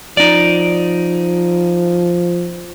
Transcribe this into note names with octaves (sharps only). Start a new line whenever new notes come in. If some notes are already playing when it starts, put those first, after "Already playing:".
F3 D#4 D5